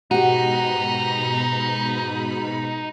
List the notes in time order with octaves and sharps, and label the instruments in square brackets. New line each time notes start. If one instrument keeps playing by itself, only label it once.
[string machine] G#2 B2 B5 [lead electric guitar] D#4 [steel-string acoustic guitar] F#4 G4